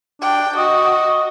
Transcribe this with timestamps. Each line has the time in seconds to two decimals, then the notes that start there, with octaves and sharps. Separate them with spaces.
0.21 D4 G5
0.57 F#4 D#5